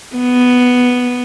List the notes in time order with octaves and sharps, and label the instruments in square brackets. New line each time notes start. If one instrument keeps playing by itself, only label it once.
[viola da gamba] B3